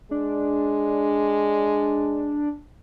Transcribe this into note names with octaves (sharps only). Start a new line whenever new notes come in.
G#3 D4